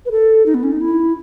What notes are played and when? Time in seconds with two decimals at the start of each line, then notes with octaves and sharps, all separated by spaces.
0.06 B4
0.11 A4
0.46 D#4
0.54 B3
0.63 C#4
0.72 D#4
0.81 E4